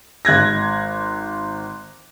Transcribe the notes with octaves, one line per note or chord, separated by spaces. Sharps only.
G#1 F#6 G#6 A#6